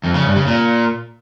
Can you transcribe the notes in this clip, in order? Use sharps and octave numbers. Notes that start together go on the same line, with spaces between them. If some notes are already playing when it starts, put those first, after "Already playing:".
F2
C#3
G2
C#3
A#2